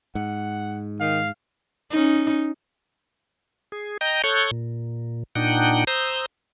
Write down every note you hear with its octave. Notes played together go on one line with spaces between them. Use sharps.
G#2 F#5
D#3 F5
C#4 D#4
G#4
D#5 G5 A#5 G6
A4 C#5 C#6 F#6 G6
A#2
A#2 D4 D#4 F#5 G5
C5 A#5 D#6 E6 G6